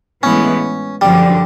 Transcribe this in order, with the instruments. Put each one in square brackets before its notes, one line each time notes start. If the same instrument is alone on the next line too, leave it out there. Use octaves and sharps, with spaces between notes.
[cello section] A2 E3 G#3 B3 [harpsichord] C#4
[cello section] F#2 D3 F3 [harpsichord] G3